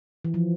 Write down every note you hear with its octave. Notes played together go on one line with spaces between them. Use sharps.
E3
F3